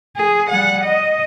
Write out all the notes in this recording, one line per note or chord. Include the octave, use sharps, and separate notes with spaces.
G#4
G3 F#5
D#5